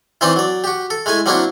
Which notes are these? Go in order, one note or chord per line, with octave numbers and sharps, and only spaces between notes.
D#3 E3 C4 D#4 C5 D5
F#3 D5
F#4 G4
A4
G#3 A3 E4 G#5
F#3 A#3 C4 D4 E4 F#4